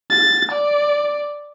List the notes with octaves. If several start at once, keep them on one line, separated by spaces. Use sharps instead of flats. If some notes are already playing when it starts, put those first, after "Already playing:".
A6
D5